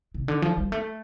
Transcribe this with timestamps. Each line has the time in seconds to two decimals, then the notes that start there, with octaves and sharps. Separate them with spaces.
0.14 C3
0.28 D3
0.42 F3
0.58 G3
0.72 A3